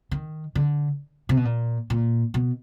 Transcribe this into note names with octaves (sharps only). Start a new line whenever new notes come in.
D#3
D3
C3
B2
A#2
A#2
B2